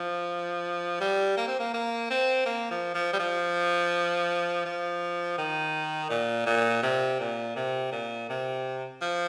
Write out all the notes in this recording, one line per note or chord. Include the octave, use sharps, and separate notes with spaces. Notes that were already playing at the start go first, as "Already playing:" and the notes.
Already playing: F3
G3
A#3
C4
A#3
A#3
C4
A#3
F3
F3
G3
F3
F3
D#3
A#2
A#2
C3
A#2
C3
A#2
C3
F3